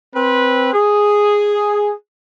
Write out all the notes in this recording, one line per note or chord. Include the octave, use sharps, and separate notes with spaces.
C4 B4
G#4